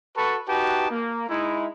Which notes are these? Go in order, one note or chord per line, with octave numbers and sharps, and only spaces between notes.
F#4 A4 B4 A5 C#6
D#4 F#4 G4 B4 A5
A#3
G#3 D#4 E4